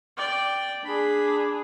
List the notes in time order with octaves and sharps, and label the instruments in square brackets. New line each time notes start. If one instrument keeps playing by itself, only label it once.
[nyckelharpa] D5 G5
[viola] D4 G#4 [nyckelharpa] B5